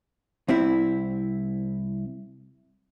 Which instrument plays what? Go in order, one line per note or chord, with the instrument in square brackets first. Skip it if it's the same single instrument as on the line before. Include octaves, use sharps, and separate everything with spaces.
[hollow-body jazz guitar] C2 C4 E4